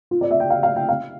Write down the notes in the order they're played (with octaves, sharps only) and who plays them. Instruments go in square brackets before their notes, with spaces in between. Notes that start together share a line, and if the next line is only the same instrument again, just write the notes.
[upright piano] F4
D5
E5
G5
F5
F5
G5
F5